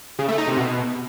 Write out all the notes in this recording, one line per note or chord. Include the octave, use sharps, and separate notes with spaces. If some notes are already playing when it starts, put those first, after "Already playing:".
C#3
A3
D#4
C3
B2